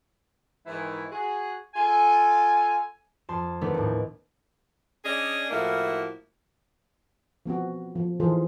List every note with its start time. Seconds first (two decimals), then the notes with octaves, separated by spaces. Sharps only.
0.66 G#2 D#3 E3 E4
1.11 F#4 G#4
1.74 F4 A4 G#5
3.29 F2 A5 C6
3.61 D#3 A3 B3 C4 D4
3.74 D#2 A2
5.05 C#4 D4 G#4 D5 D#5
5.50 A2 F3 A#3 E4 F#4
7.46 F3 B3 C4 F#4
7.96 F3
8.20 D#3 E3 F4 G#4 A4 C5